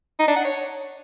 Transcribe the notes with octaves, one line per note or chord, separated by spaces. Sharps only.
D#4
D4
F#5
C#5